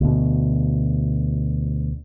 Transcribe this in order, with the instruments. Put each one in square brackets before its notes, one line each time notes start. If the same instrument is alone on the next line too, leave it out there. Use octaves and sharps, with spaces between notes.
[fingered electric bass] D2 B2